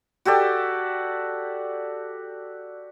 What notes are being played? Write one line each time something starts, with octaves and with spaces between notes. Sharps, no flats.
F#4 G4 A4 D5